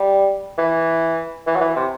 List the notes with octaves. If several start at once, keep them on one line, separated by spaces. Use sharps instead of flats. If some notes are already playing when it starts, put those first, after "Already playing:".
Already playing: G3
E3
E3
F#3
E3
C3